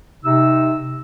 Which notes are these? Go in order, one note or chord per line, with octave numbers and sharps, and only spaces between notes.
C3 D#4 E6